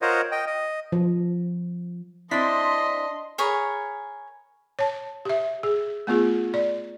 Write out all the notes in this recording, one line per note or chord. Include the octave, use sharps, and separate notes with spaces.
F4 A#4 C5 C#5 D#5 F#5
D#5 G5
D#5
F3
C4 D4 E4 D#5 C6 B6
G#4 A#4 C#5 B5
C#5 A5
G4 E5
G#4
A3 B3 F4 G#4
D5